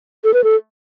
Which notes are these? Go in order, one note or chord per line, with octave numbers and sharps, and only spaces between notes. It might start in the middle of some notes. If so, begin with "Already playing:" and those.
A4
B4
A4